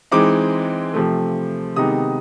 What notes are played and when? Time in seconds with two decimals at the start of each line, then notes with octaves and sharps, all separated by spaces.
0.12 E3 G#3 C4 D#4 D6
0.94 C3 F3 A3
1.76 C3 D#3 G#3 B3 D#4 D#6